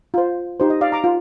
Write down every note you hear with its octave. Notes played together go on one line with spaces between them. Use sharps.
F4 C5
D#4 G4 C5
D#5
D5 F5
A#5 D6
F4